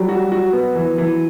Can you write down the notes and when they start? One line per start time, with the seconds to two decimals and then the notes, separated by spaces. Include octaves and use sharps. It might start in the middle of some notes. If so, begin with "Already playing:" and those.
Already playing: F#3 G3
0.09 F#4
0.32 F#4
0.53 B3
0.75 E3
0.98 E3